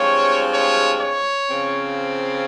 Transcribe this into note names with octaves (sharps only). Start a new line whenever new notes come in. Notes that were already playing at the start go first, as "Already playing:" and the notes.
Already playing: G2 F3 G#3 C4 C#5
C#5
C#5
C#3 F3 C4